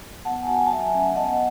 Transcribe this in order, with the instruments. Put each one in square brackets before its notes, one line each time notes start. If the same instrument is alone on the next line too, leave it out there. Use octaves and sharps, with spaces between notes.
[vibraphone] B3 F#5 A5
G#5
F#4 F#5 A5
G#5
A5
F#3 E5 G#5
A3 C#4
B3 D#5 F#5